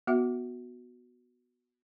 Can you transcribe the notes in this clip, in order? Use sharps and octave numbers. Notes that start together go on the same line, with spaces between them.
B3 F#4 E5